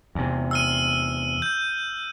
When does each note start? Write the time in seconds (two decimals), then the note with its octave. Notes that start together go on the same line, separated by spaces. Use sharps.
0.15 E2 C3
0.51 E6 F6 D#7
1.42 G6